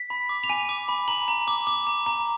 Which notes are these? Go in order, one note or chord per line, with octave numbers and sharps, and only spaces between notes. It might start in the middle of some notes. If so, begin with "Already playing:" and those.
Already playing: B6
B5
D6
F7
G#5 D#7
D6
B5
A#5 F#7
A#5
D6
D6
A#5
A#5